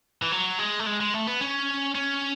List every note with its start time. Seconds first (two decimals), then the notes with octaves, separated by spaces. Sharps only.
0.22 E3
0.32 F#3
0.58 G#3
0.79 A3
0.86 G#3
1.00 G#3
1.14 A3
1.27 B3
1.41 C#4
1.95 C#4